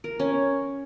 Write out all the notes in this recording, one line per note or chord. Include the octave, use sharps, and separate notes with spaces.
A#4
C#4